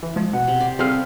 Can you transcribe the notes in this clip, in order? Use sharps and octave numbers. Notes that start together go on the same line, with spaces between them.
E3
F3 G#3
B2 F#5
C3
D5
G3 C4 G#4 A4 F5